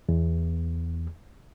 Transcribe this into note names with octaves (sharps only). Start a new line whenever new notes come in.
E2